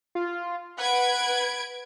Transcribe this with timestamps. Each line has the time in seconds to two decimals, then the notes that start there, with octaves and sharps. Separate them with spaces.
0.15 F4
0.78 B4 F#5 G#6 D7